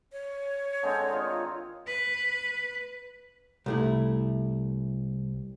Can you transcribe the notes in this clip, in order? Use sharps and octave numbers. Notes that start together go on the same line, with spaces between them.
C#5
D3 G#3 C4
D#3 F4
B4
C2 A3 E4